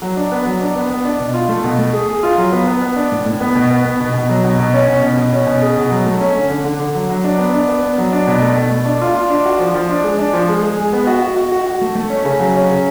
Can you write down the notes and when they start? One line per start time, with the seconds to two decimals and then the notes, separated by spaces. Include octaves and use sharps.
0.02 F#3
0.17 D4
0.32 B3
0.45 F#3
0.61 D4
0.76 B3
0.90 B3
1.05 D4
1.20 B2
1.34 F4
1.49 A3
1.64 B2
1.79 A3
1.93 G#4
2.09 G#4
2.23 F4
2.38 F#3
2.52 B3
2.67 B3
2.82 B3
2.96 D4
3.12 A2
3.26 A2
3.40 B3
3.55 B2
3.70 B3
3.85 B3
4.00 B2
4.14 B2
4.29 F#3
4.44 B2
4.59 B2
4.74 C#4
4.88 B2
5.02 B2
5.17 B2
5.32 C#4
5.47 B2
5.62 G#4
5.77 B2
5.91 F#3
6.06 A3
6.21 C#4
6.35 D3
6.50 D3
6.64 D3
6.80 D3
6.94 F#3
7.09 F#3
7.24 D4
7.39 B3
7.54 D4
7.68 B3
7.83 B3
7.98 F#3
8.12 D4
8.27 B2
8.42 A3
8.56 B2
8.71 A3
8.85 D4
9.01 F4
9.16 F4
9.30 D4
9.45 F#4
9.59 F3
9.74 F3
9.89 D4
10.04 G#3
10.18 D4
10.33 F3
10.49 G#3
10.63 G#3
10.77 G#3
10.93 B3
11.07 F#4
11.22 F#4
11.36 F#4
11.52 F#4
11.66 F#4
11.81 A3
11.95 A3
12.10 C#4
12.25 C#3
12.40 F#3
12.54 C#4
12.70 C#3